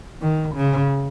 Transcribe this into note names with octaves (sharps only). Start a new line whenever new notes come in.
D#3
C#3